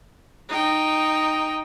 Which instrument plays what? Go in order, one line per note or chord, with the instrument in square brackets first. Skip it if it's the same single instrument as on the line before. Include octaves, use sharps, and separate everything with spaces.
[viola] D#4 G5